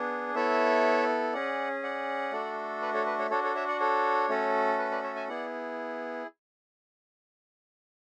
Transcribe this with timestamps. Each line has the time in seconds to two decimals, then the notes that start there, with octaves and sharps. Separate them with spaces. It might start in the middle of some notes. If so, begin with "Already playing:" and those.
Already playing: B3 D4 G#4
0.35 B3 E4 A4 C#5 E5
1.33 C#4 G#4 D5 F#5
1.83 D5 F#5
2.32 A3 D4 F#4 A4
2.82 B4 D5
2.94 A4 C#5
3.06 B4
3.19 A4 C#5
3.30 D4 F#4 A4 C#5
3.43 A4 C#5
3.55 C#5 E5
3.68 D5 F#5
3.80 A4 C#5
4.29 A3 C#4 F#4 A4
4.79 B4
4.91 B4 D5
5.03 C#5 E5
5.16 E5 G#5
5.28 B3 E4 G#4 D5 F#5